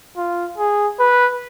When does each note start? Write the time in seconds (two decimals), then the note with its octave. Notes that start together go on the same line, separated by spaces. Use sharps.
0.17 F4
0.58 G#4
1.00 B4